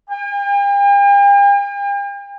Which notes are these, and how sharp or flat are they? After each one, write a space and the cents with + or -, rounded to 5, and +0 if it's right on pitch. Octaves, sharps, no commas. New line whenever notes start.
G5 +45